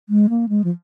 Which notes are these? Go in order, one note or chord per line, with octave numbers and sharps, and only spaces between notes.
G#3
A#3
G#3
F3